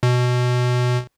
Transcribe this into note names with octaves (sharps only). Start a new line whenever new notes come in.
B2